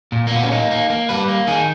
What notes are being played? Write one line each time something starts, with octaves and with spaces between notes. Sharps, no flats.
A#2
A#3
A#2 B3
C#4
A#3 D#4
A#3
A#3
G3 B4
A#3
D#3 G#4